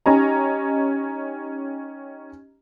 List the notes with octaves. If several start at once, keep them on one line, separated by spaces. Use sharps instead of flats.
C#4 D#4 G4 D#5 G#5 A#5